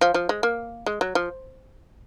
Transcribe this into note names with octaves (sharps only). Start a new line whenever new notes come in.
F3
F3
G#3
A#3
G#3
F#3
F3